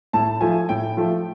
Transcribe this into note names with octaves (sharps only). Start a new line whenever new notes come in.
A2 A5
F3 A3 G#5
A2 G5
F3 A3